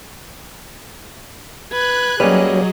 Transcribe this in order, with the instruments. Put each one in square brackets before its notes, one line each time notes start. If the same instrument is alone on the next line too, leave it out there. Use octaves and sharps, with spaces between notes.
[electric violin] B4 G#6 [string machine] F#6
[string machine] F#3 [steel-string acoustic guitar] G3 A#3 [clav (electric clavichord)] C#4 B4 [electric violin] G#4 D#5